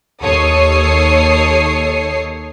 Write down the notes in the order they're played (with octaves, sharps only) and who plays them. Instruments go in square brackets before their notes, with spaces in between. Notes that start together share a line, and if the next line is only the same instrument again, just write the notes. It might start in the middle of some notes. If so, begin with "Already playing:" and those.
[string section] D#2 A4 C#5 D#6 C7 C#7